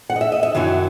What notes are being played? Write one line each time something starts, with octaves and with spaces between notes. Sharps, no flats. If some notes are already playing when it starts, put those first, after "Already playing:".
F#5
D#5
E5
D#5
E5
F#2 D#3 F#3 C#4 E4